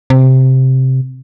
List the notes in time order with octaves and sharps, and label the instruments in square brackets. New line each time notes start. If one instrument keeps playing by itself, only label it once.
[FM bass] C3